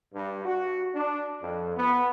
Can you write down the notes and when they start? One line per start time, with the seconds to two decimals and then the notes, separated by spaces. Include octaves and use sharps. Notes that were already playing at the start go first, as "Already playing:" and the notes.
0.13 G2
0.45 F#4
0.95 D4
1.42 F2
1.77 B3